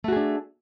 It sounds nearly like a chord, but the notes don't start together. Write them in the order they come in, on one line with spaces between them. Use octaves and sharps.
A3 F#4 G#4 D4